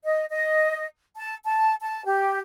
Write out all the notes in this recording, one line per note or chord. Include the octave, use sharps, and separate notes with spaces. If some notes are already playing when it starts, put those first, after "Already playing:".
D#5
D#5
A5
A5
A5
G4